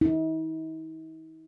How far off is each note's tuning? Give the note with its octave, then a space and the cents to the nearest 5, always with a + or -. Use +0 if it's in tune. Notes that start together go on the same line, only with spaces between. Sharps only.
D#4 +45